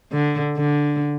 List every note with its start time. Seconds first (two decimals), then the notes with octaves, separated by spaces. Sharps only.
0.12 D3
0.57 D3